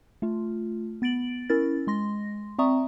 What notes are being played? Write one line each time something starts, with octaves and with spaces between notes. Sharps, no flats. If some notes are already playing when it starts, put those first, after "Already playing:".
A3 F4
B3 A6 D7 F#7
C#4 E4 A#4 A6
G#3 C6 A#6
C4 D5 E5 A#5 C#6 D#6